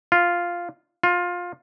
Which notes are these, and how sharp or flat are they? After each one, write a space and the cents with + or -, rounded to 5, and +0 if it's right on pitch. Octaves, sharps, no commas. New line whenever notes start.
F4 +0
F4 +20